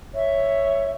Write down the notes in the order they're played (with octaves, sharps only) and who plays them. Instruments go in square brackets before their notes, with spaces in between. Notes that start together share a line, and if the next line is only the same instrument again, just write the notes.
[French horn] C#5 [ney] E5